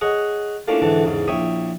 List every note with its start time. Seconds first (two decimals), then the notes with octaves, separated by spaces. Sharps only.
0.01 G#4 C#5 D#5 F#5
0.68 A3 A#3 C#4 D4 E4 F4
0.82 G#2 D3 E3 A3
1.04 E2 G#2 C#3
1.28 A#1 E4 C#5 E5 G5 D#6